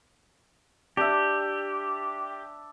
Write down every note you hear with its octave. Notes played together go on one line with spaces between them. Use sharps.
D4 G4 E5